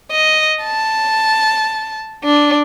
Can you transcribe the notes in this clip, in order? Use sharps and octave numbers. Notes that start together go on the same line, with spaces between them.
D#5
A5
D4